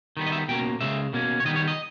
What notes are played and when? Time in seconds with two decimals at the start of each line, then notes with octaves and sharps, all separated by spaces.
0.17 D#3 G3 B3
0.27 D#5
0.32 E5
0.48 B2 A#3 C#4 G5
0.81 C#3 G#3 C#4 E5
1.13 B2 A#3 C#4
1.40 C#5
1.45 D#3 G3 B3 D#5
1.56 C#5
1.68 D#5